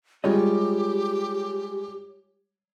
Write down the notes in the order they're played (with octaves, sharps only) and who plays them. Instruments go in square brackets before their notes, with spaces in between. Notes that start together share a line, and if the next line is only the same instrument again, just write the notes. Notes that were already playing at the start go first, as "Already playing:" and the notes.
[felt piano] G3 G#3 [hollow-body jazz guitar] F4 C#5 D#5 [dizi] G4